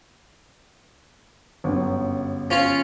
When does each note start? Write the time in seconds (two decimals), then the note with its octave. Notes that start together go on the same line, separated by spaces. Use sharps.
1.64 G1 F#2
2.51 C#4 F4